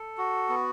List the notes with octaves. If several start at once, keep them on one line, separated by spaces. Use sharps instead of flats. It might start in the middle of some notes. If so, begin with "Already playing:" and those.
Already playing: A4
F#4
B3